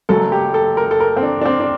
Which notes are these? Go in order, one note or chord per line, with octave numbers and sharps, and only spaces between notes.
F#1 F#2 F#3 A3 A4
G4
A4
A#4
A4
A#4
C4
D4
D4
C4
D4